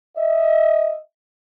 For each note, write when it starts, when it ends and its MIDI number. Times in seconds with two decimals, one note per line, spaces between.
0.17 0.98 75
0.17 0.98 76